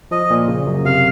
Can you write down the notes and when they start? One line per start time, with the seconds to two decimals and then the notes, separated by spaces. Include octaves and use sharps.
0.11 F3 D#5
0.30 A#2
0.48 C#3
0.67 F#2
0.85 C3 F5